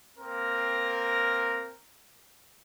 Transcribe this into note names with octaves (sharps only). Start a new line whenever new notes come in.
A#3 C4 A#4